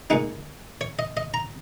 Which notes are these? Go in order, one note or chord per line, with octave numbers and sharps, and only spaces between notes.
A#2 G#3 D#4 F#5
C#5
D#5
D#5
A#5